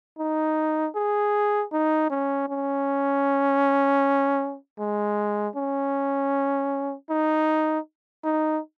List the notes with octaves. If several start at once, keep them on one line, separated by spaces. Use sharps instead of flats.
D#4
G#4
D#4
C#4
C#4
G#3
C#4
D#4
D#4